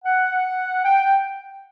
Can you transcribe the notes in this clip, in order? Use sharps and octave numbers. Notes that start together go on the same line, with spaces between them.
F#5
G5